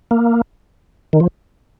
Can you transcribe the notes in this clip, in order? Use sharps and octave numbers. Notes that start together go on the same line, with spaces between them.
A#3
D#3
F3